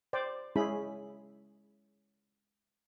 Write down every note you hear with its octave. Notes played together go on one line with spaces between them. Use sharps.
C5 D5 G5
G#3 C#4 E4 G#4 B5